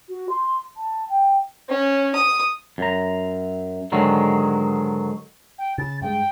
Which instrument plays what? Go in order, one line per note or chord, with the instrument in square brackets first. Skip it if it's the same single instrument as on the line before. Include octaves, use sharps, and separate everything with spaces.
[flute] F#4
C6
A5
G5
[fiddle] C#4
D#6
[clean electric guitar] F#2 A#5
G#2 D3 D#3 F#3 G#3
[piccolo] G5
[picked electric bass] C#3 [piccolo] A6
[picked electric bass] G2 G#3 [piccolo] G5